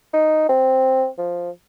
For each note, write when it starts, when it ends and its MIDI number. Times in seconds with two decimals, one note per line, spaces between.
0.14 0.47 63
0.49 1.07 60
1.18 1.50 53